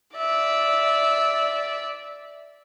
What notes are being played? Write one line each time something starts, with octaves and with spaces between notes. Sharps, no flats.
D5 E5